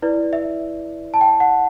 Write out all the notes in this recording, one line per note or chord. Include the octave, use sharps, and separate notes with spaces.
E4 B4 D5
E5
A5
G5
F#5